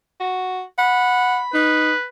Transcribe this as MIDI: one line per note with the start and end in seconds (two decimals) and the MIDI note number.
0.20 0.62 66
0.78 1.40 78
0.78 1.58 83
1.54 1.93 63
1.54 2.06 71